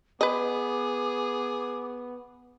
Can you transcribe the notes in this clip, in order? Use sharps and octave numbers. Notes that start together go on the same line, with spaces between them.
B3 G#4 B4 D#5 D6